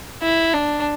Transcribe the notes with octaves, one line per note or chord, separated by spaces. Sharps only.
E4
D4